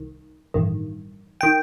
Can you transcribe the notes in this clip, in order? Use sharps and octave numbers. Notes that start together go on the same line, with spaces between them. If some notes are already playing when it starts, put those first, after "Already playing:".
Already playing: C2 D#3
A1 G2 D#3
D#3 G5